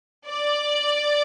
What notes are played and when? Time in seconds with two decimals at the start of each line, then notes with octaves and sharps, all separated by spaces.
0.27 D5